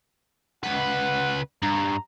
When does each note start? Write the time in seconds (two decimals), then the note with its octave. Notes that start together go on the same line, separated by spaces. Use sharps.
0.63 C#2 B4 F#5
1.62 G2 A#5